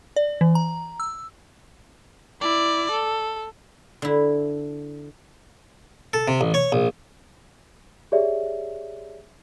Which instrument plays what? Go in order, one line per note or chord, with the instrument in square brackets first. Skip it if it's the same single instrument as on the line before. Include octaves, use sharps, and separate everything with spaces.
[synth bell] D5
E3
A#5
E6
[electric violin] E4 D5
A4
[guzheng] D3 E4
[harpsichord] A4
C3
A1
C#5
A#1
[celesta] G4 G#4 C#5 D5 E5